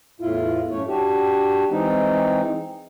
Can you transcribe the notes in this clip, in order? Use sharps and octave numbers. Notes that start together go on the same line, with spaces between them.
E2 A2 E4 F4
F#2 A2 A3 C#5
D4 F#4 G4
E3 G#3 C4 D#4